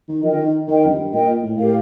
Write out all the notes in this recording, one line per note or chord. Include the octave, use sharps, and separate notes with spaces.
D#3
F3 A#4 D#5 G5
D3
D#3
D#3 A#4 D#5 G5
F2
G2
A#2 A#4 D#5 G5
A2
A2 G4 A#4 F5